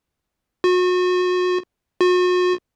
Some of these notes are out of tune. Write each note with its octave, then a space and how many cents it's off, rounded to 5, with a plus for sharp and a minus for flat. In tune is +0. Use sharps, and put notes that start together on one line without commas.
F#4 -35
F#4 -40